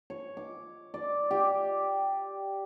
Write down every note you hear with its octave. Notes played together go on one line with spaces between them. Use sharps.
C#5
D6
D5
G4